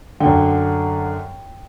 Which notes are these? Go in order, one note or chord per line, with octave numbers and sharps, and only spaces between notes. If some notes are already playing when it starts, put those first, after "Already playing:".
D3 G5
F#2